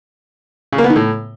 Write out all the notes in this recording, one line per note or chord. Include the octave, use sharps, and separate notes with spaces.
C#3
A#3
B3
D#3
A2